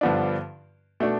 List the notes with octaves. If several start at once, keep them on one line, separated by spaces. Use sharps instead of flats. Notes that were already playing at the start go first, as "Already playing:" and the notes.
G2 D3 F3 B3 D4
B2 A3 D4